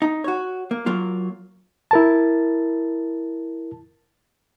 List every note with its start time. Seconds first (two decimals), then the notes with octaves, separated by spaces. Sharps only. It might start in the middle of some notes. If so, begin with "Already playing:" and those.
0.02 D#4
0.24 F#4 C#5
0.71 A#3
0.86 F#3 A#3 F4
1.91 E4 A#4 A5